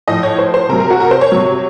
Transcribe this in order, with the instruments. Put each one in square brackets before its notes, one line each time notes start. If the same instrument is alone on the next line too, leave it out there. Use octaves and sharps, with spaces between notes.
[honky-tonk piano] A2 F3 D#5
C#5
C5
C5
C3 A#4
F#3
A#4
F#4
A#4
C5
C#5
C3 F#3